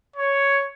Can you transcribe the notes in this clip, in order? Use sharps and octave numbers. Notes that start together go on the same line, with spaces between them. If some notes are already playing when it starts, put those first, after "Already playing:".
C#5